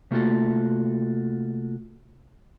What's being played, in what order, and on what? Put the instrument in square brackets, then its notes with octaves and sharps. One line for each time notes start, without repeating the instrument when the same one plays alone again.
[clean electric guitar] C3 A3 A#3 F4 F#4 A4